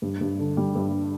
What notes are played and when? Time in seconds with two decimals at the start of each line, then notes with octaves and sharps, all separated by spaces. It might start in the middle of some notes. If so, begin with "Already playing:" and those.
0.02 G2
0.21 G2
0.39 D3
0.57 G3
0.75 G2